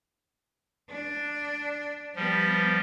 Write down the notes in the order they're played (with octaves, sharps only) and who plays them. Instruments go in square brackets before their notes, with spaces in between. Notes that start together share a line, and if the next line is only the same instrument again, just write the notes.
[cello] D4
[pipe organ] F3 G3 [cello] B3 G4